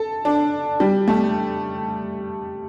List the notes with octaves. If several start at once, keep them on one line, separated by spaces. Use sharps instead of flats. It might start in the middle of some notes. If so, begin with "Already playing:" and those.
Already playing: A4
D4
G3
A3